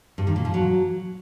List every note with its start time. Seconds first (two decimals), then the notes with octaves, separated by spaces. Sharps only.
0.18 G2
0.27 D#3
0.36 A#2
0.45 F3
0.54 F#3